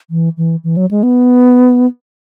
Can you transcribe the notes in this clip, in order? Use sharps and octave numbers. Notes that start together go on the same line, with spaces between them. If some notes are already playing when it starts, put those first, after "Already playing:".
E3
E3
E3
F#3
G#3
B3